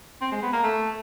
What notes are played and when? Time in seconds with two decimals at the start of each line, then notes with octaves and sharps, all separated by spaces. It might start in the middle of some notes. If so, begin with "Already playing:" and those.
0.22 C4
0.32 G#3
0.42 B3
0.53 A#3
0.63 A3